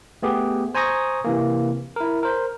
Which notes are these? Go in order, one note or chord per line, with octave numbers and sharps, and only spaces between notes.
A3 B3 G4 G#4
C5 G#5 A#5 C#6 D#6 A#6
C3 E3 A#3
E4 A#4
A#4 C5